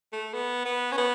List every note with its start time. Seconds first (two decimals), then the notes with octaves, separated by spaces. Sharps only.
0.13 A3
0.34 B3
0.65 B3
0.92 C#4
0.98 B3